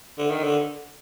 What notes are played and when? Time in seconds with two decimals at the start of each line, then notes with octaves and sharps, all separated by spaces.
0.18 D3
0.31 D#3
0.44 D3